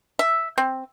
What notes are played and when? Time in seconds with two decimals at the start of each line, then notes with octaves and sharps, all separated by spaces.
0.19 E5
0.58 C4